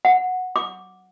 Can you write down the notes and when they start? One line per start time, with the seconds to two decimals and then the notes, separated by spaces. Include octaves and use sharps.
0.05 F#5
0.56 D6